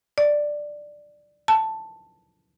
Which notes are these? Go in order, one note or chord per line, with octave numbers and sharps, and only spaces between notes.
D5
A5